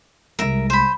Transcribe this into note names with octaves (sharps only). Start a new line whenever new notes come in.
C2 G#3 A#4 E5
C5 B5